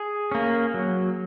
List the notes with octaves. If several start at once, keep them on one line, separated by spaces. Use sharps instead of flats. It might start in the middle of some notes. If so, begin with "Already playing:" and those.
Already playing: G#4
A#3 C#4
F#3